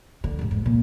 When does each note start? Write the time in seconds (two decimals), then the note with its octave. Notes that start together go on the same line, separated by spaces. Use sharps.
0.24 D3
0.39 D#2 G#2
0.51 F2 G#2
0.66 A#2